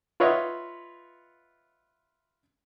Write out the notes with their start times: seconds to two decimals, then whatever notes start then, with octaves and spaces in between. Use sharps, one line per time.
0.20 F4 B4 C#5 D#5 E5 F#5